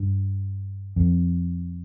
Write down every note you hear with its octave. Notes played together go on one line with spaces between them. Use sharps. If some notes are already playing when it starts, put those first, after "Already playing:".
Already playing: G2
F2